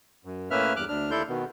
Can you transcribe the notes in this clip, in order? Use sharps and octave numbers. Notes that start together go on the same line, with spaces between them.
F#2
A2 A#3 C#4 B4 E5 F6
E2 G2 D6 F6 F#6
D2 D4 F6
D#2 E4 A4 D5 C6 G6
B2 D#3 B3